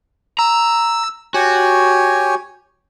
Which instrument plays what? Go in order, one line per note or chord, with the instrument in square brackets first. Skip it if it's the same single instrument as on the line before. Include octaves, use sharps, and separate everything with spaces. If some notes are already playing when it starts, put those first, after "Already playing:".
[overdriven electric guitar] A#5 [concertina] E6
[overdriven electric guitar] F#4 [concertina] G4 C#5 G#5